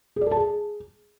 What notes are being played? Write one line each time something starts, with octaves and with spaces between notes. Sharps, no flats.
G#4
D5
A4
A5
G#4